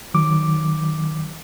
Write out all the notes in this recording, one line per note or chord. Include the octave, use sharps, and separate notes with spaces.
D#3 F#3 D6